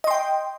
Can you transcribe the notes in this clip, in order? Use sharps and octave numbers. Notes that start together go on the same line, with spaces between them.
D#5 G5 C6